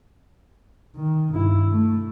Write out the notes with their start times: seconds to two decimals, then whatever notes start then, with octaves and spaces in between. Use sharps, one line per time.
0.96 D#3
1.34 G2 E4
1.72 A3